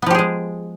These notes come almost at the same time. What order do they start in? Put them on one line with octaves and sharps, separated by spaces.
B3 F3 G4 G#4 G#3